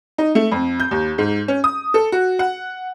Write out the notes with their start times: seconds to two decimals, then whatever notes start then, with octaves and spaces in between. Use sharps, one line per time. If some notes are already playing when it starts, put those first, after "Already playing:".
0.18 D#4
0.35 A3
0.52 F2
0.80 G6
0.91 D#2
1.18 G#2
1.48 C#4
1.64 D#6
1.94 A4
2.12 F#4
2.39 F#5